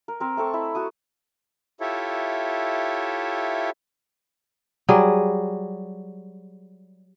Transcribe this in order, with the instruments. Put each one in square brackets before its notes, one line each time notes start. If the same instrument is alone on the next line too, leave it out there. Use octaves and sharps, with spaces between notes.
[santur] A#4
C4 A#4 C5
A3 C4 A4 C#6
E4 E5 B5
F#4 A5 D#6
[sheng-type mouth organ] E4 F4 G4 A4 C#5 E5
[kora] F#3 G3 G#4